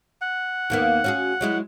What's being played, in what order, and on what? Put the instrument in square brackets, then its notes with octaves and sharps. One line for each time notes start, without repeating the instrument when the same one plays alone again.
[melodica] F#5
[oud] D#2 A#3 B3
C#4 F#4 G#4
F#3 G#3 E4